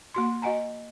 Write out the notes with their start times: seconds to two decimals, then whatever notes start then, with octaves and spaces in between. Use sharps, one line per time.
0.14 A#3 F#4 C6
0.42 F#4 D#5 F#5 G#5 A#5